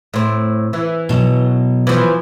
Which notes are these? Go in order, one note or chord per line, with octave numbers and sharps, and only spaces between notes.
A2 C4
E3
B2 F#3
E3 F3